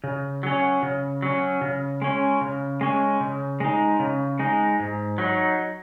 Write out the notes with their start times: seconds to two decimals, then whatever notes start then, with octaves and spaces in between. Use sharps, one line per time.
0.04 C#3
0.43 F#3 C#4
0.83 C#3
1.22 F#3 C#4
1.61 C#3
2.02 G#3 C#4
2.41 C#3
2.81 G#3 C#4
3.20 C#3
3.60 G#3 D#4
4.00 C#3
4.39 G#3 D#4
4.80 G#2
5.18 F#3 D#4